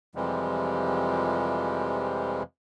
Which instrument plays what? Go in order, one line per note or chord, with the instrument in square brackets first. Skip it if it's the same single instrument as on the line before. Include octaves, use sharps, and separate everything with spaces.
[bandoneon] F2 C3 E3 F3 G3 G#3